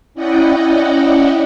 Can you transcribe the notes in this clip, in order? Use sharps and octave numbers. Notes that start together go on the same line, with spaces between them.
C#4 E4 D5 D#5 F#5 G5